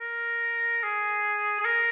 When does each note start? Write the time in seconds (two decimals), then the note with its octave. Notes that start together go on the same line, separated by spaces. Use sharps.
0.01 A#4
0.83 G#4
1.60 G#4
1.65 A#4